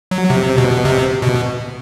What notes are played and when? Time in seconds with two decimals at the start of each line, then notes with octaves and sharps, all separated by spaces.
0.11 F#3
0.30 C3
0.58 B2
0.85 C3
1.22 B2